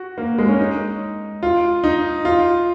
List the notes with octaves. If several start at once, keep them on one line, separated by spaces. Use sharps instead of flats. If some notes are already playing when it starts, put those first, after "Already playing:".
Already playing: F#4
A#3
G#3
C#4
D#4
F4
D#4
F4